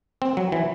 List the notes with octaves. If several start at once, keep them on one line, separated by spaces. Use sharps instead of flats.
C4
F#3
E3